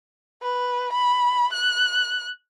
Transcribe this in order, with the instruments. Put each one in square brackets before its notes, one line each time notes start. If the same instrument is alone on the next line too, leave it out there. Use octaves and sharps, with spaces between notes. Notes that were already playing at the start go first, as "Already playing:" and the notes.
[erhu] B4
B5
F#6